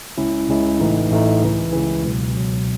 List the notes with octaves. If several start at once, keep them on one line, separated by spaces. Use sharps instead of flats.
C#2 C#3 G#3 C#4 E4
C#2 C#3 G#3 C#4 E4
A1 A2 E3 A3 D#4
A1 A2 E3 A3 D#4
C#2 C#3 E3
C#2 C#3 E3
C#2 B2 F#3
C#2 B2 F#3